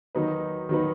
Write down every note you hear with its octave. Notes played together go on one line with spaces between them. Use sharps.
D#3 F#3 D#4 B4
D#3 F#3 D#4 B4